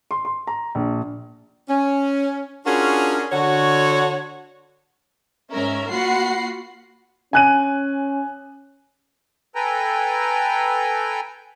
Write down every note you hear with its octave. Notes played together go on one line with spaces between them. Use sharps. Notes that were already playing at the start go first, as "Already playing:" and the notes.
C6
C6
A#5
A#1
C#4
C#4 D4 F4 F#4 G#4 A#4
D3 F#4 C#5
G#2 C#4 A#4 E5
A#3 F4 F#4 F#5 B5 C7
C#4 G#5 F#6 D#7
A4 B4 G5 G#5 A#5